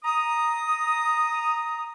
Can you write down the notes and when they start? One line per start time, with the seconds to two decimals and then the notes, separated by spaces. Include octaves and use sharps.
0.04 A#5 D#6